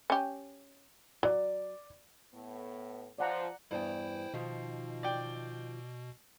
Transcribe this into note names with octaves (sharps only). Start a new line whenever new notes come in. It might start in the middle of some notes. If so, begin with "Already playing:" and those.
C#4 G4
F#3 D5
A2 B3
F3 D5 F#5 A#5
E2 G2 E4 C5 G5
B2 D#3 F3
D5 G5